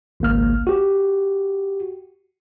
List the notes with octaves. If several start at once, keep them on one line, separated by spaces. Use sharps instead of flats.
G#1 C#2 A#3 F6
F#4 G4